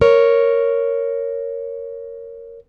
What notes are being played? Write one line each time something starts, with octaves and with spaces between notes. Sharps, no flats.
A#4 C#5